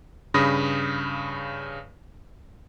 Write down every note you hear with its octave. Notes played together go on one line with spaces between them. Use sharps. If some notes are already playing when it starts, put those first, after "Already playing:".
G2 C#3 B5 D#6 A#6